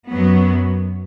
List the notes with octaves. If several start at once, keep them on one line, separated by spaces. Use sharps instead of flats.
F#2 F#3 B3